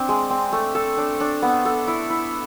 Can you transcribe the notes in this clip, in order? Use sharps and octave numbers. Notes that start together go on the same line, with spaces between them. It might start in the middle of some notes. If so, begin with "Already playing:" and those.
Already playing: C4 D4
G#3
C4
A3
A4
D4
D4
B3
A4
E4
E4